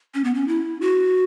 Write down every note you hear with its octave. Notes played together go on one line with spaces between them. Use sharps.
C#4
B3
C#4
E4
F#4